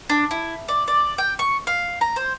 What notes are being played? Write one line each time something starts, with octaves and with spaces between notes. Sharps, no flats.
D4
E4
D5
D5
G5
C#6
F5
A#5
C5